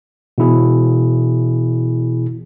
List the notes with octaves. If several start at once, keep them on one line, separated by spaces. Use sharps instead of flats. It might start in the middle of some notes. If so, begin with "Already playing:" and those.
B2 E3 E4 G#4